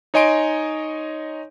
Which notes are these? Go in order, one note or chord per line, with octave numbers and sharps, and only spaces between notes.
D#4 C#5 D#5 G#5 C6 D7